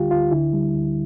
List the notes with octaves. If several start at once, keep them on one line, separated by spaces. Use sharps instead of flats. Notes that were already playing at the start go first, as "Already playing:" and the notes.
Already playing: D2 D3 G3 F4 G4
D2 F4
D3 E4
G3
D2